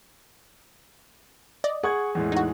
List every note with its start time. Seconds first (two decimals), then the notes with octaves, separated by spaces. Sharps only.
1.64 D5 D#5
1.83 G#4 F#5 C#6 G#6
2.15 E2 A2 G#3
2.32 D#4 F#4